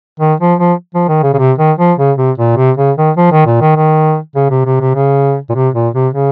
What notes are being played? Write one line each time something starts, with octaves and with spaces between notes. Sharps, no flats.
D#3
F3
F3
F3
D#3
C#3
C#3
C3
D#3
F3
C#3
C3
A#2
C3
C#3
D#3
F3
D#3
A#2
D#3
D#3
C#3
C3
C3
C3
C#3
A#2
C3
A#2
C3
C#3